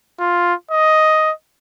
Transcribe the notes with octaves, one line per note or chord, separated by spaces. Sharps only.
F4
D#5